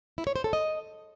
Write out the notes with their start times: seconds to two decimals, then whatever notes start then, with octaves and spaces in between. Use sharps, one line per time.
0.18 E4
0.27 C#5
0.36 C5
0.44 A4
0.53 D#5